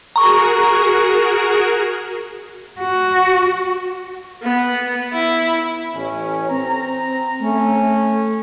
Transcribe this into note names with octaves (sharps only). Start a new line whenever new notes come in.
F#4 G#4 A#4 A#5 C#6
F#4
B3
E4
A1 C#4
C4 A#5
A3 C#4